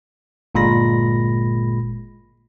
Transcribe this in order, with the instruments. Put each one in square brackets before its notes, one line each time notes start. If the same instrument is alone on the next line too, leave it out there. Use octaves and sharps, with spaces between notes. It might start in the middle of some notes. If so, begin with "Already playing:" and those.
[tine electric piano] G1 A#2 G#3 B5 A#6